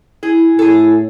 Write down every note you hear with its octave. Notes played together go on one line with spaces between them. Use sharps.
E4 G#4
A2 G#4 A4